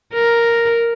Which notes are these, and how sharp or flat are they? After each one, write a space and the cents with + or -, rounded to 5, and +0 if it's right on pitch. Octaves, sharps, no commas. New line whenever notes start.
A#4 +0